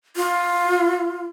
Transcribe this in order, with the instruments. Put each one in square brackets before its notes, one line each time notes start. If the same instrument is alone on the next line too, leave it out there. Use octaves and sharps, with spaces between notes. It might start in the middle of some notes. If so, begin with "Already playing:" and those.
[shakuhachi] F4